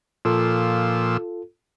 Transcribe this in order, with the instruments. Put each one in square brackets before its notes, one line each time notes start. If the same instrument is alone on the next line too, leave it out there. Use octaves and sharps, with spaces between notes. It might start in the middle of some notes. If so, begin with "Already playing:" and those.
[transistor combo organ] A#2 F3 E6 [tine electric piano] F4 A4